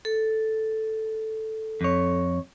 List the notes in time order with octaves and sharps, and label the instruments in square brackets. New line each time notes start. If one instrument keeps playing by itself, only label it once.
[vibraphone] A4
[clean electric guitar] F2 C#5